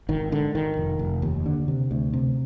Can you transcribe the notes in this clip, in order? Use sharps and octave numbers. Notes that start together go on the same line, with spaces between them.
G#1 D#3
G#2 D3
G#1 D#3
F1
F1
D#2
D3
C3
D2
C3